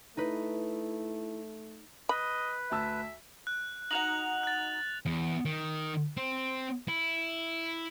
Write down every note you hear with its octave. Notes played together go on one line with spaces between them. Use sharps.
A3 D#4 E4 B4
B4 D#5 B5
D2 E5 A5 E6
F#6
D#4 F#4 F#5 F#6 F7 F#7
F#6 A6
E2
D#3
C4
E4